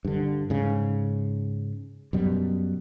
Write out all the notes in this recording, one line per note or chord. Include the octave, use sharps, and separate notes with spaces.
G2 D3
G#2 C#3
F#2 B2 G3